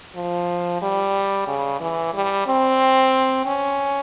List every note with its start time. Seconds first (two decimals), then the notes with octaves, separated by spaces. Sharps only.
0.15 F3
0.82 G3
1.48 C#3
1.80 E3
2.14 G3
2.47 C4
3.46 C#4